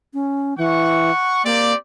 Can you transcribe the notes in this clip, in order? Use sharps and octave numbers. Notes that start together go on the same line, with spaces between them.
C#4
E3 F#5 C#6
A#3 C4 G4 D5